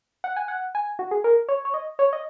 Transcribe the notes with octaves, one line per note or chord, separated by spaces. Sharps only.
F#5
G#5
F#5
G#5
F#4
G#4
A#4
C#5
C#5
D#5
C#5
D#5